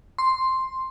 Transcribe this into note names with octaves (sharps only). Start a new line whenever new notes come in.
C6